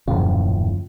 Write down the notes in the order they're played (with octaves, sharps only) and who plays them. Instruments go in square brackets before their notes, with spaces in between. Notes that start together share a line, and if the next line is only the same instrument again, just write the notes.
[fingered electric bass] D#1 A2 [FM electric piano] F#2 F4 [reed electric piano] C#3 F3